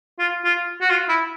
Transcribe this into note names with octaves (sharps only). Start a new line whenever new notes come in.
F4
F4
F#4
F4
E4